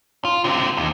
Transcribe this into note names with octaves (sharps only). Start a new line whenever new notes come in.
F4
D3 C4
D#2